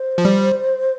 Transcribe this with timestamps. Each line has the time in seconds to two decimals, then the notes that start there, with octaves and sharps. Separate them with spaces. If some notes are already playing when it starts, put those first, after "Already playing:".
Already playing: C5
0.18 F3
0.25 G3